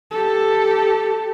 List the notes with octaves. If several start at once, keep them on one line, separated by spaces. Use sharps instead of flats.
G4 A4